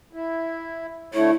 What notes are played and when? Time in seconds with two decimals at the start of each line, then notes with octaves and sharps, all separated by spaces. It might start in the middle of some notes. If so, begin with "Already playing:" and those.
0.13 E4
1.14 D3 A3 E4 C#5